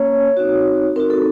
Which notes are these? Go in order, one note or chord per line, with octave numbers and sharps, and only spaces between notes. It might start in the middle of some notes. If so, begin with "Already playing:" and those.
Already playing: A#3 C#4 C#5
C4 D#4 F#4
C4 D#4 F#4 A#4
A4